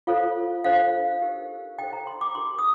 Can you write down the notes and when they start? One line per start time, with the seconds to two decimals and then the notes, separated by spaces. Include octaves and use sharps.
0.07 F4 A4 C5 F5
0.64 D4 A4 C5 F5
1.21 D#4 G4 A#4
1.79 D4 A4 C5 G5
1.93 A#5
2.07 C6
2.21 D6
2.35 D4 G4 A#4 C6
2.59 D#6